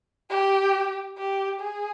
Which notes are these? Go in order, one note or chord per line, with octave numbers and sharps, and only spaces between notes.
G4
G4
G#4